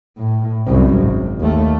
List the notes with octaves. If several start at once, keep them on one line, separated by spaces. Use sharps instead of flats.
A2
C2 F#2
G#1
D#2 A3